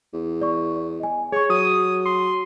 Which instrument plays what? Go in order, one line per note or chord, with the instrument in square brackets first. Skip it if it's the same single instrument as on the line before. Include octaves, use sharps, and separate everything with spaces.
[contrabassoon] E2
[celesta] D5 C#6
D#5 G#5
[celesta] G#4 C#6 [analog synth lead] C#5
[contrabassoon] F#3 [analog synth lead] D#6
[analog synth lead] C6